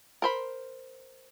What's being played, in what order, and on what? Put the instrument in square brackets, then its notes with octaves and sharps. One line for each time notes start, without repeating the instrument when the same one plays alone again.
[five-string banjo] A#4 C5 B5